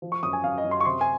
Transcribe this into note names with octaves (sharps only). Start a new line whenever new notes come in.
F3
C#6
F#2 D#6
G#5
F#2 F5
D#5
F#2
C6
C#6
C3 C6
G#5